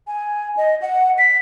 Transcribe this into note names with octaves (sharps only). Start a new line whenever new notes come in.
G#5
D#5
F#5
B6